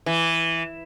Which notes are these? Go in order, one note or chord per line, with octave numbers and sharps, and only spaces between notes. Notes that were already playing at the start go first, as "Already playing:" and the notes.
E3